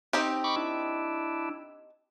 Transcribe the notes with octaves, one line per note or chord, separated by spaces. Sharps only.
C4 D#4 G4
B5 C#6 D6
D4 E4